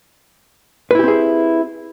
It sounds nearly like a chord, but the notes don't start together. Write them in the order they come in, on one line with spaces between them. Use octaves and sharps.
B4 E4 G4 C4 G#4